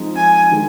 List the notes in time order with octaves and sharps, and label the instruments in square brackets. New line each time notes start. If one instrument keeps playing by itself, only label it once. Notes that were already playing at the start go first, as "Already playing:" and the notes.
Already playing: [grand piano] F3 G#3 C4 D#4
[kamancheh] G#5
[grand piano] D#3 G#3